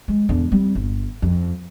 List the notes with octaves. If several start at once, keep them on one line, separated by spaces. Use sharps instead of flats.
G#3
E2 D3
G3 C4
G1
F2